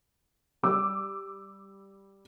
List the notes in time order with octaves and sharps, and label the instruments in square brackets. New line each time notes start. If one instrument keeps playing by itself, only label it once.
[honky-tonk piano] G3 D6 E6